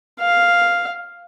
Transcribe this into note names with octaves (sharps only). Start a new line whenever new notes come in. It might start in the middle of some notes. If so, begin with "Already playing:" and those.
F5